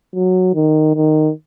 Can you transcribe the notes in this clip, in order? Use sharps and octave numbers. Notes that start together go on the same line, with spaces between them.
F#3
D#3
D#3